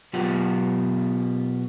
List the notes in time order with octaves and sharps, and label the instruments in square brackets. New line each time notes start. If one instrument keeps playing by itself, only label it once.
[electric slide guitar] B2 F#3 B3 F4 G4 F#5